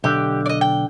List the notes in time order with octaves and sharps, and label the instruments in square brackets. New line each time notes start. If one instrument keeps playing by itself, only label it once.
[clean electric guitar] B1 D3 [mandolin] G4
[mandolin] D5 D#5
G5